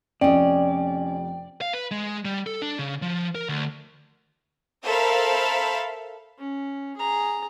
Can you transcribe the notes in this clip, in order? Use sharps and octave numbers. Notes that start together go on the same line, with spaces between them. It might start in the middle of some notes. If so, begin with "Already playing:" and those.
F1 F2 C#4 D5 D#5 G5
F5
B4
G#3
G3
A4
D4
C#3
F3
A#4
D2
A4 A#4 C5 E5 F5 B5
C#4
G#4 A#5